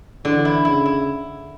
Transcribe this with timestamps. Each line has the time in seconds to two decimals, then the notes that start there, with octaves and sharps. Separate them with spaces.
0.25 D3 E3
0.45 E4
0.65 C#3 E4
0.85 E4